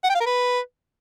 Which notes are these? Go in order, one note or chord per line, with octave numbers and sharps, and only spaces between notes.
F#5
G5
F5
A#4
B4